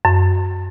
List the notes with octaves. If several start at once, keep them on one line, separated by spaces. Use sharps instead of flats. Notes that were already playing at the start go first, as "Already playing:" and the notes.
F#2